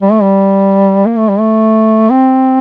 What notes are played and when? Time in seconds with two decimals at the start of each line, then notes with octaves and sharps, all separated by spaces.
0.02 G3
0.11 A3
0.22 G3
1.06 A#3
1.17 A3
1.29 G3
1.40 A3
2.10 C4